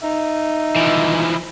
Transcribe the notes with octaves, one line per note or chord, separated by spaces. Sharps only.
D#4 E5
E3 F3